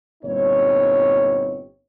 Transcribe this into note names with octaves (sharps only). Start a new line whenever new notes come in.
G1 A#2 G3 C4 D#4 C#5